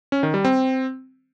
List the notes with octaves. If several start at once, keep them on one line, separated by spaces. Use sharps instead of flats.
C#4
D#3
G3
C4